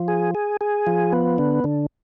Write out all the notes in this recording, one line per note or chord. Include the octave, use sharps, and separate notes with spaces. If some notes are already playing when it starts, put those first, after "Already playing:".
Already playing: F3
G#4
G#4
G#4
F3
B3
D3
D3